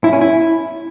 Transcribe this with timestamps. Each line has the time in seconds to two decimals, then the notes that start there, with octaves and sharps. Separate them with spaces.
0.04 E4
0.13 C#4
0.21 E4